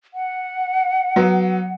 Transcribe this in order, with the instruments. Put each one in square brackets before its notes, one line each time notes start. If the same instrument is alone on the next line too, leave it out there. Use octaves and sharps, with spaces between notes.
[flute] F#5
[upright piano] F#3 B3